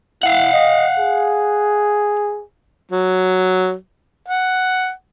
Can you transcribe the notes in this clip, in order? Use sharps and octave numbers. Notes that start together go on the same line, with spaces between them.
E4 F5 F#5
D#5
G#4
F#3
F#5